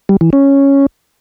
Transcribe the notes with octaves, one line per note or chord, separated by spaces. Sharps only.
G3
E3
C#4